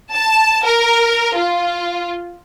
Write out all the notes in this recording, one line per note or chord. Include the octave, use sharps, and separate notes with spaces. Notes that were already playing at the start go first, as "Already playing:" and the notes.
A5
A#4
F4